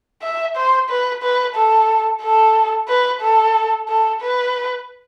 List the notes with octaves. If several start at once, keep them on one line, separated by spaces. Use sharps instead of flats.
E5
C5
B4
B4
A4
A4
B4
A4
A4
B4